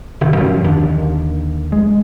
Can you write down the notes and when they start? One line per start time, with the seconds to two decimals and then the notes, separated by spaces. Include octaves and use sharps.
0.21 G1 C3 D#3
0.37 F#2 F3 C#4
0.64 D#2 D3 D#3 D4
1.72 G#3